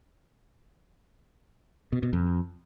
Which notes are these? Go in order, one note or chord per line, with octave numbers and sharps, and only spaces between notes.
B2
B2
F2